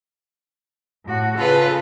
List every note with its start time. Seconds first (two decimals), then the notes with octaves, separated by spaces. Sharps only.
1.05 A2 F#4
1.38 C#3 F4 A4 B4